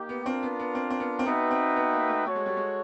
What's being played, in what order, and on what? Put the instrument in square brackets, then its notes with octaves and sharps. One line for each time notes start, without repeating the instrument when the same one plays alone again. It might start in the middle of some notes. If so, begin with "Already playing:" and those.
Already playing: [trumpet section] A#3 D#4 G4
[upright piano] B3
[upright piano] C4 [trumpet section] D4 F4 A#4
[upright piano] B3
B3
C4
C4
B3
C4
[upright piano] B3 [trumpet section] D#4 F#4 B4 E5 G5
[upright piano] C4
B3
A#3
A3
[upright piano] A3 [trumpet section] F#4 A4 C#5
[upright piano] G#3
G3
G#3